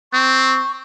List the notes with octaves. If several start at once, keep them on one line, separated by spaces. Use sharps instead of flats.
C4 C#6